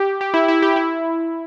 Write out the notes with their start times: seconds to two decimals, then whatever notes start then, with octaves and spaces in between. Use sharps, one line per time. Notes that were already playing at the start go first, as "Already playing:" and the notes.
Already playing: G4
0.21 G4
0.34 E4
0.48 E4
0.62 G4
0.76 E4